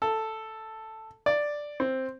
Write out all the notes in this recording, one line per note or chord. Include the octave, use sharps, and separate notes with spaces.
A4
D5
C4